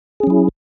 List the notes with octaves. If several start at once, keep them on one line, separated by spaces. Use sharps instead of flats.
F#3 C#4 E4 G#4